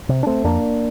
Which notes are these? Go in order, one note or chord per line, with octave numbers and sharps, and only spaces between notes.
C3
D4
A3 C4
F2 A#3 D4